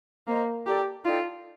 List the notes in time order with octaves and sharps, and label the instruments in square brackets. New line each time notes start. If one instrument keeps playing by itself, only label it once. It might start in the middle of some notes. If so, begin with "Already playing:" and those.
[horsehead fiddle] A#3 [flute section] C5 D#5 A#5
[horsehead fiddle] G4 [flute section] A4 D5 G5 A#5
[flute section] D#4 A4 D5 G5 [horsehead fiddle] F4